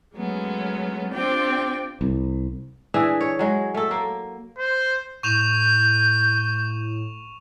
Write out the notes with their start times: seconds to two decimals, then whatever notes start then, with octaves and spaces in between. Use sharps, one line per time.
0.14 F#3 G#3 A3 B3 C#4
1.12 C4 D4 F4 G4 D5 G5
2.01 C2
2.94 E3 D4 G#4 E5
3.21 C#5
3.39 F#3 G#3
3.74 A3 A4
3.91 A#3
4.58 C5
5.23 A2 C#6 G6 E7 F7